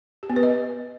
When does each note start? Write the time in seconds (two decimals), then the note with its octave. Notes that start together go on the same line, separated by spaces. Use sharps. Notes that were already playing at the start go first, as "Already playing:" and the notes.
0.23 G4
0.30 B3
0.36 B4
0.43 D#5